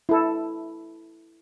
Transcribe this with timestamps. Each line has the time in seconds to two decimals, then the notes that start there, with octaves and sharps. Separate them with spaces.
0.09 E4 A4